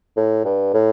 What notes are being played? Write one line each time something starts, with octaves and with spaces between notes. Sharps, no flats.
A2
G2
A2